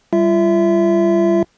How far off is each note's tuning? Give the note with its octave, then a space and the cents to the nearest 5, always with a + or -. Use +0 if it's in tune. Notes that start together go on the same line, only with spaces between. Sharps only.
G3 +0 F4 -35 E5 +0